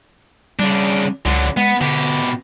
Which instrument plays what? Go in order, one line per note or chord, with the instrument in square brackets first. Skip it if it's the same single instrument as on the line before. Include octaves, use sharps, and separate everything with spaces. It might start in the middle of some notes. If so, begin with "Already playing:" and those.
[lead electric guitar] C#3 D4 [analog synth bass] G3
[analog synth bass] C#2 [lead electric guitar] D3 F#3
[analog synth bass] G#3 [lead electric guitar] B3
[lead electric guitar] B2 G4 [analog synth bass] D3